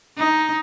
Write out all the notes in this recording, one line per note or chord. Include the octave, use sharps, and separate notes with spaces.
D#4